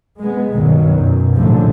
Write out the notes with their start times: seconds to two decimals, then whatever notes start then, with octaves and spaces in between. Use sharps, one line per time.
0.20 G#3 B3
0.55 B1 G2 B2 D#3 F#3
0.91 F#2 B2
1.33 A#1 F#2 A2 D3 F3 F#3